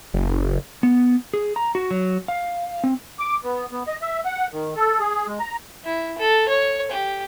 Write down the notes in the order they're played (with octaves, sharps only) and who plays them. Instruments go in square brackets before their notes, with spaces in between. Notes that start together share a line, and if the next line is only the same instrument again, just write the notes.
[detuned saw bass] F#1
[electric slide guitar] B3
G#4
A#5
F#4
F#3
F5
C4
[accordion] D6
B3
B3
D#5
E5
F#5
D#3
A4
G#4
G#3
A#5
[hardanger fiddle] E4
A4
C#5
G4